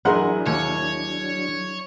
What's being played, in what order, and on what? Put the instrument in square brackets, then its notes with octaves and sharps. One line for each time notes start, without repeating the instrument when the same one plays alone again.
[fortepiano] A1 F#5 C6 [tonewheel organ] F#3 D4 [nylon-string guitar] E4 G#4 A#4
[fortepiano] D#2 [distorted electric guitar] C#5